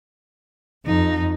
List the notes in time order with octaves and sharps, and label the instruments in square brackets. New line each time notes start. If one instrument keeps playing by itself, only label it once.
[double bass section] F2 [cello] D#4